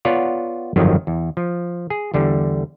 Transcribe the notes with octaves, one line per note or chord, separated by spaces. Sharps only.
B3 F4 C#5 D5 F#5
G1 F2 D#3 F3 F#3
E2
F3
G#4
E2 D3 G3